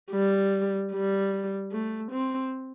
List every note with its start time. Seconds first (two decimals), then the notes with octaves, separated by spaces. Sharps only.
0.12 G3
0.92 G3
1.72 A3
2.12 C4